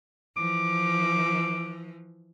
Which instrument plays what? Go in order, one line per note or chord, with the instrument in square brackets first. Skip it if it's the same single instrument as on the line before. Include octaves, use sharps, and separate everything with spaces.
[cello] E3 F3 [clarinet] D6